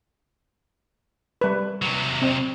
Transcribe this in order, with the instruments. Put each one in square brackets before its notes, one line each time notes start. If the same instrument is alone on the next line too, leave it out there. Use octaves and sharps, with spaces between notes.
[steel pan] G3 B4
[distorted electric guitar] C3 F#3
[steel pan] C4